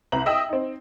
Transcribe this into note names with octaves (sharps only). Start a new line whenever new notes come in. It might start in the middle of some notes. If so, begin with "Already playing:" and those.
C2 B4 A#5 F#7
D#5 E5 G5 D#6 E6
C4 D#4